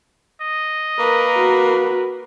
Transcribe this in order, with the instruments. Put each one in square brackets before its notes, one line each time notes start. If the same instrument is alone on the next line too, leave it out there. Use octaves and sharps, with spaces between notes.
[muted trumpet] D#5
[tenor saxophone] A#3 [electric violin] A#4 B4
[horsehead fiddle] F#4